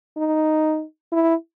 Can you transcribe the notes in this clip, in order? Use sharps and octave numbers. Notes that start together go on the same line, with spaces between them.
D#4
E4